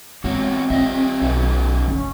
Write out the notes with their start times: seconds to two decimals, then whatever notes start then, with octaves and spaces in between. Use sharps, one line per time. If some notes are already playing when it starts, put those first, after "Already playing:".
0.24 E2 G#3 C4 F#4 C#5
0.70 G3 F4 D#5 E5
1.22 B1 D#3 C#4 F#4
1.88 F#1 C#4